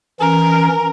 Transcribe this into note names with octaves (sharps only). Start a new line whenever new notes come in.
E3 C#4 A#4